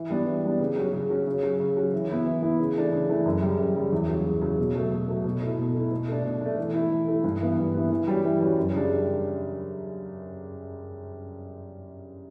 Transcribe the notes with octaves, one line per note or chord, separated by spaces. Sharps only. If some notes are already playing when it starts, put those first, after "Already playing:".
Already playing: E3
G3 B3 D4
E3
G3 B3 D4
C#3
F#3 C#4 F#4
C#3
F#3 C#4 F#4
C#3
F#3 C#4 F#4
C#3
F#3 C#4 F#4
E3
B3 E4
E3
B3 E4
C#3
E3 A3 D4
C#3
E3 A3 D4
F#2
C#3 G3
F#2
C#3 G3
E2
C#3 F#3
E2
C#3 F#3
B2
F#3 A3
B2
F#3 A3
B2
A3 E4
B2
A3 E4
B2
A3 D4
B2
A3 D4
E3
A3 E4
E3
A3 E4
G2
E3 B3
G2
E3 B3
E3
G3 C#4 F#4
E3
G3 C#4 F#4
F#2
C#3 G3 D4